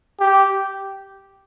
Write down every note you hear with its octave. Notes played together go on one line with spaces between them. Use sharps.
G4